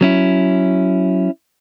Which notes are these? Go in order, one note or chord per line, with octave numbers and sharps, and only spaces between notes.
F#3 C#4 E4